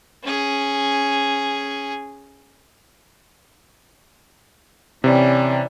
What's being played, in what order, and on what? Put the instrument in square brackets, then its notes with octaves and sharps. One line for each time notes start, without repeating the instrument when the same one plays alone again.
[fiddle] C#4 G#4
[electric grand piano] C3 [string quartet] E3 G3 C#4